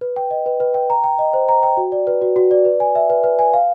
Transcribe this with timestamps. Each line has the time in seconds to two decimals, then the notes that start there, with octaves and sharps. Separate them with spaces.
0.01 B4
0.16 G5
0.31 D#5
0.46 B4
0.60 B4
0.74 G5
0.90 A#5
1.04 G5
1.19 D#5
1.33 C5
1.49 A#5
1.63 G5
1.77 F#4
1.92 D5
2.07 B4
2.22 F#4
2.36 F#4
2.51 D5
2.65 B4
2.80 G#5
2.95 E5
3.10 B4
3.24 B4
3.39 G#5
3.54 F5